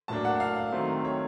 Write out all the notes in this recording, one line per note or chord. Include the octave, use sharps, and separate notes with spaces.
A2 F#3 A#3 D4 A5
F#5
F5
D#3 F#3 A3 C4
C#5